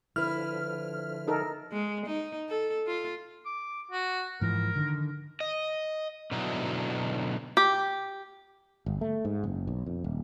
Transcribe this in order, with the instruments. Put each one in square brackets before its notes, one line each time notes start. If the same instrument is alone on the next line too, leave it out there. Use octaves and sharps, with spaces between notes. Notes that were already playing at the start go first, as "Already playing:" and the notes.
[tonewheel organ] D3 F3 [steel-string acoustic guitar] E4 B4 [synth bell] F6
[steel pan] D#4 A4 A#4
[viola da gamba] G#3
D#4
A4
F4
[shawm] D6
F#4
[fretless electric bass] G#2 E3 F3 [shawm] A#4
[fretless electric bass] D3 D#3
[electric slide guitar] D#5
B2 D3 F#3 D#4 E4 F#4
[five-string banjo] G4
[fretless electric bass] G1
A3
G#2
F#1
B1
F2
D#1